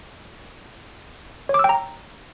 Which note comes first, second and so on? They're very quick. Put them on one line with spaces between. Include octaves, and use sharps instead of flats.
C#5 D6 E6 G5 A#5